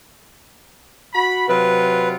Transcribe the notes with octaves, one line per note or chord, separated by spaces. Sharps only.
F#4 B5
C3 F#3 F4 B4